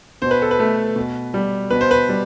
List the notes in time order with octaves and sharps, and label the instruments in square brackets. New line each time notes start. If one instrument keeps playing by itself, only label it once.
[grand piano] B2 C5
B4
A4
B4
A3
B2
G3
B2 B4
C5
B4
G3